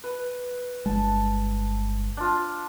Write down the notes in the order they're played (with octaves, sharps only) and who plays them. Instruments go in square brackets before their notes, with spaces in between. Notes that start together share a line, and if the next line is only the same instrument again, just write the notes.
[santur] B4
[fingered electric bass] G1 G#3 [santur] A5
[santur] D4 F4